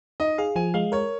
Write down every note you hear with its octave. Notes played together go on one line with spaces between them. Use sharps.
D#4 D#5
G#4 F5
F3 G#5
G#3 F5
A#4 C#5